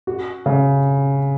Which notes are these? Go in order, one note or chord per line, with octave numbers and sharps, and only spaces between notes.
F#4
C#3